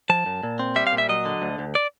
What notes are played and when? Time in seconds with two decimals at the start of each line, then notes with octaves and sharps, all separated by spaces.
0.10 F3 A5
0.26 F#2
0.43 A#2
0.59 C4
0.76 G3 E5
0.87 F5
0.93 A#2
0.98 E5
1.09 F#3 D#5
1.25 D3
1.42 D2
1.59 D2
1.75 D5